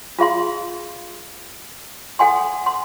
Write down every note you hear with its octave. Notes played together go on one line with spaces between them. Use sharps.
F4 G#4 F5 C6
A4 F#5 G#5 C6
C6